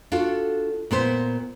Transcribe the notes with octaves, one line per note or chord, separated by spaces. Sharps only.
D4 F4 F#4 A4
A#2 B3 C5